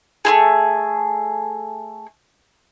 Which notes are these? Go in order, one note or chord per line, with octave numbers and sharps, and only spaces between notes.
A3 E4 G#4